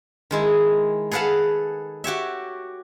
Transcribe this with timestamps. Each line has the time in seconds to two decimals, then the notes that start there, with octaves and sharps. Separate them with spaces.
0.31 D#3 G#3 E4
1.11 G#4 A4 B4 F5 F#5 A5
2.04 F#4 G4 C#5 E5